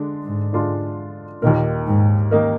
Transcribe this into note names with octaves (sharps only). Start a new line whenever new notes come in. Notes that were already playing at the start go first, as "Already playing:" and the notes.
Already playing: D3 G#3 D4
G#2
D3 G#3 D4 F4
D#2 A#2 D#3 A#3 D#4 A#4
G#2
D#3 A#3 D#4 A#4